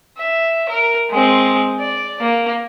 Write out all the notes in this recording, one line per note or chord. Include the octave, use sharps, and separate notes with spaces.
E5
A#4
G#3 C4
D5
A#3